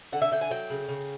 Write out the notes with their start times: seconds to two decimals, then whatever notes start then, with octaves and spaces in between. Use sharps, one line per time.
0.12 D3 F#5
0.22 E5
0.32 D3 G5
0.41 G#5
0.51 F#3 G5
0.70 C#3
0.89 C#3